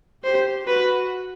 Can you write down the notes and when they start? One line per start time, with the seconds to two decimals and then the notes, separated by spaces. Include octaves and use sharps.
0.24 G4 C5
0.67 F#4 B4